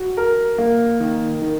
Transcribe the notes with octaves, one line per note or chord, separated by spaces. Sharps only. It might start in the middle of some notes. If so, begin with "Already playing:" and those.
Already playing: F#4
A#4
A#3
D#3
D#3